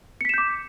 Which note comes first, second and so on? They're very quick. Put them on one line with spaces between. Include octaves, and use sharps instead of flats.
C#7 B6 E7 G6 D6